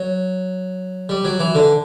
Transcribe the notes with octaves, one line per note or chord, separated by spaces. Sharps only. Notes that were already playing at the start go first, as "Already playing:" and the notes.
Already playing: F#3
G3
F#3
E3
D3